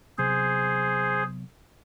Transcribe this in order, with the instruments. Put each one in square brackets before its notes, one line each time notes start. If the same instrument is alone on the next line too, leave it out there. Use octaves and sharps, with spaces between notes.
[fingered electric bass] C3 F#3 B3 [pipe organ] G#4 C5